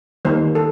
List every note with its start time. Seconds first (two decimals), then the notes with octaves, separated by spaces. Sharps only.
0.25 D#3 G3 A#3 C5
0.55 A4